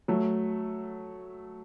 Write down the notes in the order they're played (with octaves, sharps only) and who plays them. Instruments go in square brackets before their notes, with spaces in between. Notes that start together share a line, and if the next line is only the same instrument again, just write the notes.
[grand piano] F#3 A3